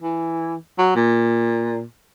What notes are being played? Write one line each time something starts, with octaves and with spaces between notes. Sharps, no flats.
E3
F#3
A#2